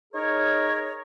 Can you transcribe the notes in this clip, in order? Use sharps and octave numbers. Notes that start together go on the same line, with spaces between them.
D#4 G#4 A#4 C#5